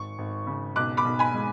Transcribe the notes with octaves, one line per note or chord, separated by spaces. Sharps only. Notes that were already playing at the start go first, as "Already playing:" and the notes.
Already playing: G#1 C#6
G#1
C#3
B1 D6 F#6
B5 D6
B1
G#5 B5
G#3